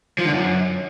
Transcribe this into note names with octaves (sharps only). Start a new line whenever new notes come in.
F3
D3
F#2